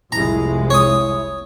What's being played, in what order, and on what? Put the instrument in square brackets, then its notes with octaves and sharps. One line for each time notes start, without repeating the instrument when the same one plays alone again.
[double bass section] F1 C2 G#3 [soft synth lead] E4 [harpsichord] A#5
[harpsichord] C#5 D#6